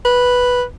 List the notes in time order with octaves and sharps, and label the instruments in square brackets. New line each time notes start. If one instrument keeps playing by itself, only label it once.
[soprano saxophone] B4